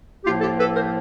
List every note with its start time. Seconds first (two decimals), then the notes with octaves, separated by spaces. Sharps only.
0.25 A#3 F4 G4
0.28 A2 F3
0.41 G4 A4
0.58 A4 B4
0.75 A#4 C5